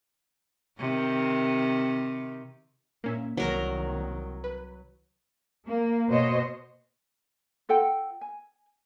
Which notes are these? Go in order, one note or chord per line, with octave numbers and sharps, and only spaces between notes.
C3 D#3
A#2 A#3 C#4 E5
C2 D#3 F#3 A#4 A#5
B4
A#3
B2 C5 C#5 D#5
F4 A4 F#5 G5
G#5